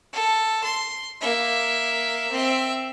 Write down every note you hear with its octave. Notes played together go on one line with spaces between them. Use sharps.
A4
C6
A#3 E5
C4 E5